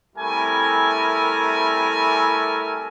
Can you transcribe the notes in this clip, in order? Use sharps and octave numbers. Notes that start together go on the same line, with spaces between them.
G3 A3 C4 E4 A#4 G#5